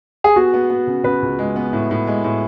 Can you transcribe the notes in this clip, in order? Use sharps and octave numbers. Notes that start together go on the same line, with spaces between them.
G#4
B3 F#4
B3
B3
C#3
C#3 B4
C#2
G#3
B3
A2
A2
G#3
A2